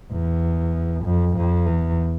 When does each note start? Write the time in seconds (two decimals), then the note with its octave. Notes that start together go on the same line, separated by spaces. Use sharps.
0.12 E2
1.05 F2
1.37 F2
1.67 E2